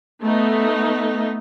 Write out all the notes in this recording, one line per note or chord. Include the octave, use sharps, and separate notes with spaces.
A3 B3 D#4